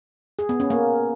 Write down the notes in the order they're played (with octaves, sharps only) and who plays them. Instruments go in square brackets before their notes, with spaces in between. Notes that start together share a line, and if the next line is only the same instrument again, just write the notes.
[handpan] G#4
B3
C#4
A#3